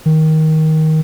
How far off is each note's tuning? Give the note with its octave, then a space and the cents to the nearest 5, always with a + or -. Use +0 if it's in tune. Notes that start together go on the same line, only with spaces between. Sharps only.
D#3 +15